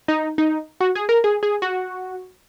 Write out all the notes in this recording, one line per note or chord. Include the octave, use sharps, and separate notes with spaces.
D#4
D#4
F#4
G#4
A#4
G#4
G#4
F#4